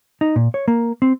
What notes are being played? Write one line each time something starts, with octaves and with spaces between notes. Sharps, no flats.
D#4
A#2
C#5
A#3
C4